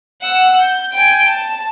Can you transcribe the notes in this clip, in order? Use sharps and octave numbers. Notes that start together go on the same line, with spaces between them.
F#5 E6
G6
G5 G#5
A5